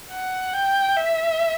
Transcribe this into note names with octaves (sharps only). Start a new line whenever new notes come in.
F#5
G5
E5